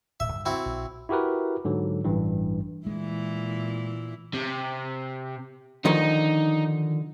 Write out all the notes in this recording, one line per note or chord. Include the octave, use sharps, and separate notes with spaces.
D1 A#2 G#3 E5
C#2 G2 D3
C4 E4 F#4
A#1
E4 F#4 G4 A#4 B4
G#2 D3 F#3
A1 G2 E3
A#2 E3 G#3 E4
C3
D3 D#3 F3 D#4